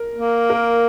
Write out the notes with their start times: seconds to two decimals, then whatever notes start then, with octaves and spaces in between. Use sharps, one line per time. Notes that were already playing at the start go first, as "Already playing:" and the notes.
Already playing: A#4
0.14 A#3
0.50 A#4